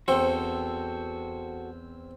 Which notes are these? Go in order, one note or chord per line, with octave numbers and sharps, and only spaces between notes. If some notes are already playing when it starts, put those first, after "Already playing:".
E2 C4 F#4 A4 C5 G5